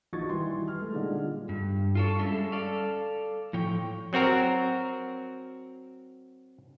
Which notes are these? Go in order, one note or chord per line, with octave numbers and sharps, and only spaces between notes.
A#1 D#4 F#4 C#6 G#6 A6
D#3 E3 G3 C6
F6
A3
A#2 D3 G3 G#3 D#4
F4
G2
F4 A4 C#5
G3 G#3 C#4 A4 E5
A4 D5 F5
A2 F3 C#5 G5
F#3 C4 F#4 A#4